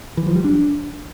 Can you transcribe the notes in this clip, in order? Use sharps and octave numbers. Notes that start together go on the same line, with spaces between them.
E3
F3
G3
D4